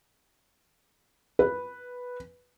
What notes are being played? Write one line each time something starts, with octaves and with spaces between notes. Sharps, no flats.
B4